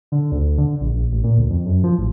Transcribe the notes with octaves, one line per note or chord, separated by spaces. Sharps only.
D3
D2
D3
A#1
A#1
A1
A#2
D2
F2
F#2
F3
A1